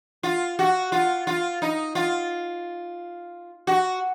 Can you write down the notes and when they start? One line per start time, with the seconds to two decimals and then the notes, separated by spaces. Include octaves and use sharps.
0.23 F4
0.59 F#4
0.92 F4
1.27 F4
1.62 D#4
1.95 F4
3.67 F#4